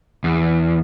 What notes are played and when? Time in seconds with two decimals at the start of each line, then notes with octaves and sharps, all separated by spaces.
0.24 E2